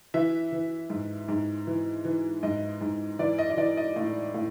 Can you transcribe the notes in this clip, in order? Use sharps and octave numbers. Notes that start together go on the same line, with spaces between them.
E3 E5
E3
G#2
G#2
E3
E3
G#2 D#5
G#2
E3 D5
D#5
D#5
E3 D5
D#5
A2
A2